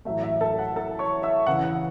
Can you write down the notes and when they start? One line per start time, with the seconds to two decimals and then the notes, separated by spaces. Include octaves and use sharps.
0.05 A1 A2 F#3 A3 E5
0.23 E5
0.41 A4 A5
0.59 F#5
0.76 A4 A5
0.99 C#5 C#6
1.23 E5 E6
1.46 E2 C#3 E3 F#5
1.64 F#5